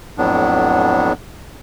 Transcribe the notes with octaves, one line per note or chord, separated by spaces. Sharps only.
F2 A2 F#3 B3 D4